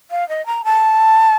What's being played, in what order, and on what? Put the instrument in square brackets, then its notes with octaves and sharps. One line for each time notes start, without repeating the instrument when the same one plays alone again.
[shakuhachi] F5
D#5
A#5
A5